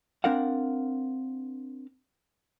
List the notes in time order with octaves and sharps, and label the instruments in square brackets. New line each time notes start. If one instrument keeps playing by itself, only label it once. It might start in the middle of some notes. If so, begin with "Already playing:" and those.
[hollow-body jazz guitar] C4 D4 A#4 F5 F#5